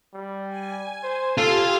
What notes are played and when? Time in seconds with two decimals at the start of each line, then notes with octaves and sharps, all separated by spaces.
0.14 G3
0.49 G#5
1.03 C5
1.38 F4 G4 A4 F5 G#5